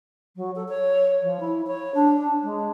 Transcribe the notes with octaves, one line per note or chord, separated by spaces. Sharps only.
F#3
A4
C#5
F3
E4
C#5
D4
G#3